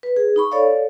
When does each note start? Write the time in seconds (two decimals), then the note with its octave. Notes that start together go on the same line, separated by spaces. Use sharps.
0.03 B4
0.16 G#4
0.36 D#4 B5 C#6
0.51 A4 C#5 D5 F5